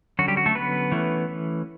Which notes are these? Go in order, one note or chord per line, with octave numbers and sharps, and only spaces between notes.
D3 F#3 C#4 F#4
G3 G4
F#4
A3 A4
B3 B4
E3 A3 C#4